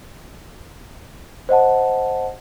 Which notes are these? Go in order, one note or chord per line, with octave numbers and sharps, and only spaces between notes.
C5 D#5 F#5 A5